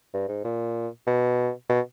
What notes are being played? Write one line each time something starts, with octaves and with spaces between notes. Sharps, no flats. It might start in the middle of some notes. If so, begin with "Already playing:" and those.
G2
G#2
A#2
B2
B2